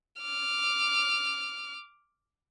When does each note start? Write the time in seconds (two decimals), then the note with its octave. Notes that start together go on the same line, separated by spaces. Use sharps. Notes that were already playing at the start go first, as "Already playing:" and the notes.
0.22 D6 F6